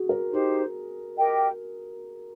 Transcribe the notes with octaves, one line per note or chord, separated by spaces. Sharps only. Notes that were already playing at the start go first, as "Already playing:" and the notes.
Already playing: F#4 G#4
A#4
D#4 G4 C5
G4 A#4 D#5 G5